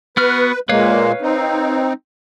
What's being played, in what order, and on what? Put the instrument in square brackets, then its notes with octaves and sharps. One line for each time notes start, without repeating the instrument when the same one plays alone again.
[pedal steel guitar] B3 F#4 F6 [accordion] B4
[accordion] A#2 G#3 A#3 [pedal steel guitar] B4 C#5 F5
[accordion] C4 D#4